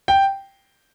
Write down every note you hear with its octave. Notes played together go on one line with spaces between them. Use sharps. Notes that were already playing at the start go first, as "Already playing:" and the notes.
G5